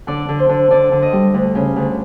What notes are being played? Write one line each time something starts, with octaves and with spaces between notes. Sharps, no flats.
D3 D5
D3
C5
D3
D3 D5
D3
D#5
G3
D2
C#3
D2